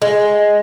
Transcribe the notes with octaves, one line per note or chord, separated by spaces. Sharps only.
G#3